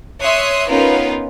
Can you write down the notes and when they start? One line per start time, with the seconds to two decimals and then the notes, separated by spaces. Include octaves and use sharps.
0.22 C#5 E5 C6 D#6 F#6
0.70 B3 C#4 D#4 F4 A#4 B4